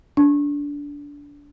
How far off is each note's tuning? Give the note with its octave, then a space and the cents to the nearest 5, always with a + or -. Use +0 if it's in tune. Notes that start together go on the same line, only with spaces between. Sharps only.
D4 -20